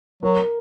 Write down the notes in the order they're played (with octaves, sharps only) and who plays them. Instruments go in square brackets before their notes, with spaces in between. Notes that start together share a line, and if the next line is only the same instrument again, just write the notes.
[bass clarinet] F#3 [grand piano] A#4